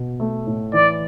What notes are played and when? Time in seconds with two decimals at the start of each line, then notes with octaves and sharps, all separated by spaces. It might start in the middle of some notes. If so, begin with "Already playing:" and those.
Already playing: B2
0.20 A3
0.46 A2
0.73 E3 D5